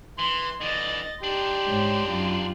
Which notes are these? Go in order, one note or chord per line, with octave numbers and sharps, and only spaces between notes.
E3 C6
D3 E3 D#5 A6
D4 D#4 G4 C6
G#2 C#5
F#2 F4